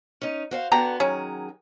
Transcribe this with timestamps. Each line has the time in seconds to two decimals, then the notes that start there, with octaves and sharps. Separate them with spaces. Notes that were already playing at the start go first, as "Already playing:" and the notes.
0.21 C#4 D#4
0.51 F#4 C5 F5
0.72 D3 B3 F#4 G5 A#5
1.00 D#3 F#3 C#4 G#4